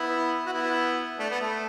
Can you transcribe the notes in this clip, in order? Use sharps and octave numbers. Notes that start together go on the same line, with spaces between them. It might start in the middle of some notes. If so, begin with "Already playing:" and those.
Already playing: B3 E4
F#4
B3 E4
A3 D4
B3
A3